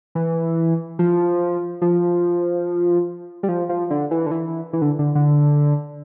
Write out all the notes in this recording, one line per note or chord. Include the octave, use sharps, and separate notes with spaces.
E3
F3
F3
G3
F3
F3
D3
E3
D3
E3
E3
D3
D3
D3